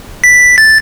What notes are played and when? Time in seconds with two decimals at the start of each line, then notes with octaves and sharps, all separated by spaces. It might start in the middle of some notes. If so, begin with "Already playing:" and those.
0.24 B6
0.58 A6